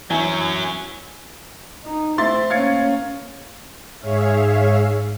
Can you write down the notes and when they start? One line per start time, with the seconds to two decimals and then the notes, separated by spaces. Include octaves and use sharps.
0.10 E3 F#3 C#4 E5 G#5
1.84 D#4
2.18 A3 C4 E4 C6 A6
2.50 A#3 C#4 F5 G#6 C#7
4.00 G#2 G#4 C#5 E5 F5